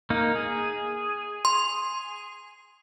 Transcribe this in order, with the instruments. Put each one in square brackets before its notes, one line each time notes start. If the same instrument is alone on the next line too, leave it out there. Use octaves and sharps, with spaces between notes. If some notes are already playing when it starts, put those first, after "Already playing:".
[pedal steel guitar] A#3 D#4
G#4
[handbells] C6